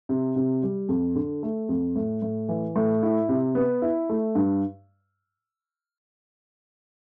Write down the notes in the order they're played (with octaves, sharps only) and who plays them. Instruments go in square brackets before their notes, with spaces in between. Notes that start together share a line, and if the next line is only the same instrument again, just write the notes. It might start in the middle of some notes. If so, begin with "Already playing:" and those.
[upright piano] C3
C3
G3
F2
D3
A3
F2
A2
A2
E3
A2
E4
C3
B3
E4
A3
G2